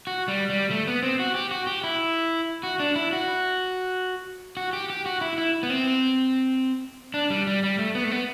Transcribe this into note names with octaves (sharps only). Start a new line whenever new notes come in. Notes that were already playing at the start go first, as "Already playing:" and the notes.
F#4
G3
G3
A3
B3
C4
F#4
G4
F#4
G4
E4
F#4
D4
E4
F#4
F#4
G4
G4
F#4
E4
E4
B3
C4
D4
G3
G3
G3
A3
B3
A3
B3